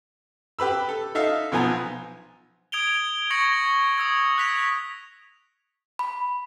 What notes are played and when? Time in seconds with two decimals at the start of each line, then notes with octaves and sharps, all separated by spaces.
0.59 G4 B4 B5 E6
0.89 A4
1.15 D#4 A4 E5 F5
1.52 B1 F3 B3 G#5 A#5
2.72 D#6 G#6 D7 F7 G7
3.31 C#6 G#6 A#6 C#7 F#7 G7
3.98 D#6 E6 G#6
4.38 F#6 B6 F7
5.99 B5